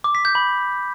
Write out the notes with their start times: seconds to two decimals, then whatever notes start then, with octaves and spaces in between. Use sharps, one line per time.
0.04 D6
0.15 B6
0.25 G6
0.35 B5